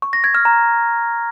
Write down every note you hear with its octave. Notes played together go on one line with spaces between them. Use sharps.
C#6
A#6
G#6
F6
A#5